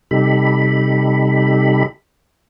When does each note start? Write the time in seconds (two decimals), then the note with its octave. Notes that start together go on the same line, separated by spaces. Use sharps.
0.11 C3 G3 D#4 G4 A4 B5